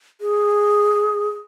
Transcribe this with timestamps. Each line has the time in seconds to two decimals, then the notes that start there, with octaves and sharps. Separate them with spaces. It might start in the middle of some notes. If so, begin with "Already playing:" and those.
0.21 G#4